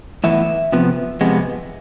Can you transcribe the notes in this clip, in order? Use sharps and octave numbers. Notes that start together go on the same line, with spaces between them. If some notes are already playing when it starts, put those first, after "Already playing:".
A2 E3 B3 E5
C3 F3 B3
F2 C3 G#3 B3